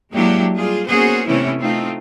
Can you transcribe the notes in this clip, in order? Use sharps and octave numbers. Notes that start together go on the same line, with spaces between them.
F#3 G#3 A#3 D4 E4 G4
G3 F4 G#4
A#3 B3 C#4 F#4 G#4 C5
C3 E3 A3 B3 C#4 E4
A3 C4 D#4 F4